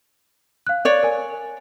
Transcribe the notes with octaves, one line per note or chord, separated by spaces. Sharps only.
F5 F#6
C#5 D5
A#4 G#5